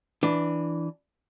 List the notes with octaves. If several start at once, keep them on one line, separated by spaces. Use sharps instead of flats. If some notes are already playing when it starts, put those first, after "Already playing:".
E3 D4